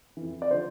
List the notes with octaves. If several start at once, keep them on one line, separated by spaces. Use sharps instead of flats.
F2 E3
D5
D3 F3 C5